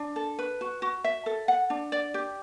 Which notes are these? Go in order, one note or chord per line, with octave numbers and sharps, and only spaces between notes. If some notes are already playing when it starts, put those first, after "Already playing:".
Already playing: D4
A4
B4
F#4
F#4
E5
A4
F#5
D4
D5
G4